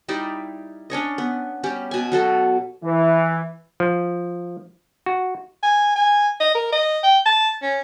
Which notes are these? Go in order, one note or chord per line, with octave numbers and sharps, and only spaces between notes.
G3 D#4 E4 D5
C#4 D4 C#5 D#5
B3
G3 C#4 G4
B2 G#5
F#3 F#4 A4
E3
F3
F#4
G#5
G#5
D#5
A#4
D#5
G5
A5
C#4